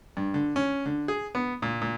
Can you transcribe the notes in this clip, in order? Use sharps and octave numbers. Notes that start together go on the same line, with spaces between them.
G2
D3
C#4
D3
G#4
B3
A#2
A#2